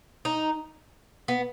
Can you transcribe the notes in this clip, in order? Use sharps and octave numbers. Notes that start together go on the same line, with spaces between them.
D#4
B3